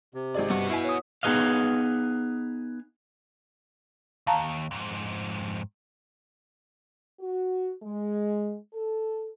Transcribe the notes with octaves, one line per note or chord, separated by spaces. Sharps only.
C3
G#1 G#4 D5 D#5
G2 B3 F#4
E4 F5 G#5
C#5 D#6
B3 D#4 G#4 B4 D#5 F5
D#2 F5 A5 A#5
F2 G#2
F#4
G#3
A4